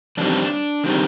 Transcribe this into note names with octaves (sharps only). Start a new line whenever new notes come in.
F2 D#3 G3 C4 D4
D#3 G3 C4